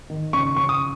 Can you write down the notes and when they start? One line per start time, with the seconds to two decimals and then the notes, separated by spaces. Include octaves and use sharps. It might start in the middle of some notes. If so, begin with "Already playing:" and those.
0.10 D#3
0.33 C#3 C#6
0.57 C#3 C#6
0.69 D#6